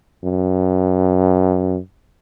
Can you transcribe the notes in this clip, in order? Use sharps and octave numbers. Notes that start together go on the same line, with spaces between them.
F#2